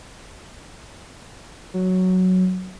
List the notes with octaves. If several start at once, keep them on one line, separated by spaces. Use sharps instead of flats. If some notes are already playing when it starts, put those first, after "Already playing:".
F#3